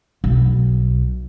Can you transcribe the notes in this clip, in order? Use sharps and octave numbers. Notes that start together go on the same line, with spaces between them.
B1